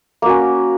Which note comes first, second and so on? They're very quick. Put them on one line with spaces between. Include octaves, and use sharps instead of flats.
A#3 F#4 C#4